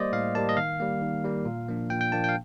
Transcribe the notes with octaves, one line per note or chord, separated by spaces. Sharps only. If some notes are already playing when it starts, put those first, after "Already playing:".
Already playing: G3 A#3 C5 D5 D#5
A2 F5
G3 A#3 A5
D#5
D#3 F5
G3 A#3
D#3
G3 A#3
A#2
F3 A#3 D4
A#2 G5
G5
F3 A#3 D4 A5
F5 G5